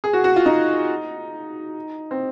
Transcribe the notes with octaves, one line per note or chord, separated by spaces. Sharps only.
G#4
F#4
F#4
F4
D#4
C4